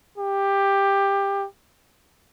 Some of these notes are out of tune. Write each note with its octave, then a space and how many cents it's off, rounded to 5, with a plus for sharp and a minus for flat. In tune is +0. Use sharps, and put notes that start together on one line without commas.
G4 +15